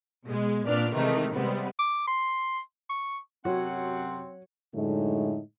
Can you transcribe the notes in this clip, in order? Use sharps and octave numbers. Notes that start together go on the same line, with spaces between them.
B2 G#3
A#2 B3 C4 D4 D5 F6
C3 D#3 E3 G#3 A3 D#4
C3 G3 G#3 B3 C4
D6
C6
C#6
F#2 C3 F#3 C4 F#4 C#5 F#5
F#2 A2 D3 G#3 A3 D#4